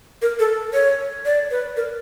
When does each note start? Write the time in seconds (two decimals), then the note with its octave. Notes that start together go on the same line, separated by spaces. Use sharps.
0.22 A#4
0.39 A4
0.73 C#5
1.25 D5
1.51 B4
1.77 A#4